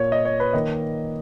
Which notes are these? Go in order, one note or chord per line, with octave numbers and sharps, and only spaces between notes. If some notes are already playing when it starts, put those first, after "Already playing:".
Already playing: A#2 A#3 C#5
D#5
C#5
B4
D#3 A#3 D#5